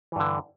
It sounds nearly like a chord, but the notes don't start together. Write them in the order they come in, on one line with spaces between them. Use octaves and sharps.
E3 G2 D3